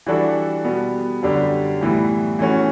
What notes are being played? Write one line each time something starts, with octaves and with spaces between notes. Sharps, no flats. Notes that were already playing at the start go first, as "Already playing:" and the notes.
E3 G3 D4 F#4 A4
B2 G3 B3
F#2 D3 G3 D4 G4
A2 E3 G3 B3
E3 A3 C#4 F#4